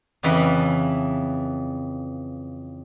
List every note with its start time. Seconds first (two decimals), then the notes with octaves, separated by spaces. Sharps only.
0.23 F2 C#3 E3 B4